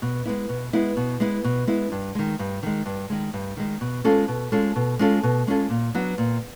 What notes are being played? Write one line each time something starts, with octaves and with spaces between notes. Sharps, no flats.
B2
G#3 B3 E4
B2
G#3 B3 E4
B2
G#3 B3 E4
B2
G#3 B3 E4
G2
D#3 G#3
G2
D#3 G#3
G2
D#3 G#3
G2
D#3 G#3
B2
G#3 C#4 F4 A4
B2
G#3 C#4 F4 A4
B2
G#3 C#4 F4 A4
B2
G#3 C#4 F4 A4
A#2
F#3 B3 D4 F#4
A#2